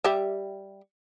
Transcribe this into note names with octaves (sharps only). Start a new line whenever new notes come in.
G3 G4 E5